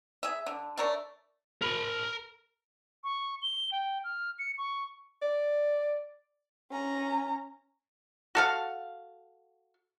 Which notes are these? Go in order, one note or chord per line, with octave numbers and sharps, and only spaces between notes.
G#4 E5
D3
A3 D4 A#4 C#5
A#4 B5
C#6
G7
G5
F6
C#7
C#6
D5
C#4 A#5
F#4 A4 F5